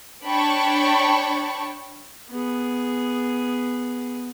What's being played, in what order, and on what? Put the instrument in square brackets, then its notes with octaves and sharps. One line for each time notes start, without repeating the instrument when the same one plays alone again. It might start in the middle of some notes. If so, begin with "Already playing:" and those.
[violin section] D4 C#5 G5 A5 B5 C#6
[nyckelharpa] B3 G#4